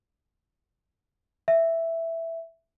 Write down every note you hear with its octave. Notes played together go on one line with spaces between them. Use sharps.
E5